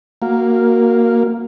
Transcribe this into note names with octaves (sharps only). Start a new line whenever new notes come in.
A#3 F#4 A#4 F5